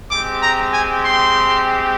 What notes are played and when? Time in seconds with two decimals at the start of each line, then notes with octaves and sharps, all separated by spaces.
0.10 G#3 C4 G4 D6
0.42 A#5
0.72 G#5
1.03 C6